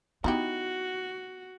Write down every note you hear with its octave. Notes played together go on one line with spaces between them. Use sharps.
B3 D#4 E4 F#4 G4